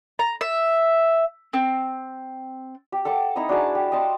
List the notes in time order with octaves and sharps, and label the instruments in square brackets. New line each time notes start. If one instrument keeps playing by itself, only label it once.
[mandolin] A#5
E5
C4
[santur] G4
A4 F#5 A5 D6
D#4 E4 A#5 D#6
D4 F#4 G#4 A5
G4
D#5 A5 C6